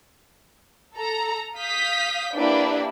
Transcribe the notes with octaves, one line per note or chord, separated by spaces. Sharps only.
A4 A#5
F5 D#6 G6 B6
A#3 D4 E4 G4 B4